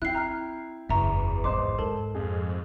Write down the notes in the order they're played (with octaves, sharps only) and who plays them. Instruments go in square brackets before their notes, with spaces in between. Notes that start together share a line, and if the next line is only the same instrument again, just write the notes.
[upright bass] C4 [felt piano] E4 G5 [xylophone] F#6 C7
[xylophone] A#5 F6
[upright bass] F#1 [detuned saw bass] E2 [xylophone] E5 A#5 C#6
[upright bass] G#1 C#2 [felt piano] C5 D#5 C6 [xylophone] D6
[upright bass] G#2 [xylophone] A4 A#4 A5
[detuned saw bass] F2 [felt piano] G#4